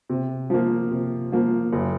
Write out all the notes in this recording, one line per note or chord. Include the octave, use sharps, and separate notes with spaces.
C3
F3 A#3
C3
F3 A#3
F#1